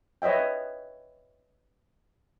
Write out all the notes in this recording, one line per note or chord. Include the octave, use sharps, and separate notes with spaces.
B4 C#5 D#5 E5 G5